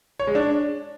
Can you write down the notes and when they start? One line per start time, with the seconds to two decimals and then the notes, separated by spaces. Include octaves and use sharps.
0.20 C#5
0.27 G#3
0.35 D4